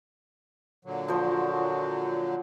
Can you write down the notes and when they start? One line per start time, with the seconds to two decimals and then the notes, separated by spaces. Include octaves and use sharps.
0.85 A#2 D3 F#3
1.08 F3 F#4 C5